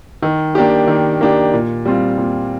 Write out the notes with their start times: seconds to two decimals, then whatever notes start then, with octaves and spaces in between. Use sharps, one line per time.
0.23 D#3
0.55 A#3 D4 G4
0.87 D#3
1.21 A#3 D4 G4
1.54 A#2
1.85 G3 C4 F4
2.18 A#2